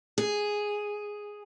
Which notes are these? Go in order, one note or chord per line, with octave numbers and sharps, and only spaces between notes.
G#4